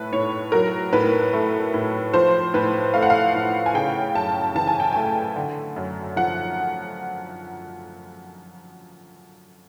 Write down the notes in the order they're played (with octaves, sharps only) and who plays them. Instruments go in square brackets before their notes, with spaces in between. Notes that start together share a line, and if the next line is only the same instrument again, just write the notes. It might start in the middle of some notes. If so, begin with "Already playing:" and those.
Already playing: [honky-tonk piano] A2 A3 B4
A2 C#5
F#3 A#4
A2 B4
A3
A2
F3 C5
A2 B4
A3 F5
F#5
F5
A2
G#5
C#3 G5
F#2 A5
E3 A5
G#5
G5
A3 G#5
D3
F#2
F3 F#5